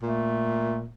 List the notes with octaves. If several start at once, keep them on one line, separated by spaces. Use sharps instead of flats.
A#2 A3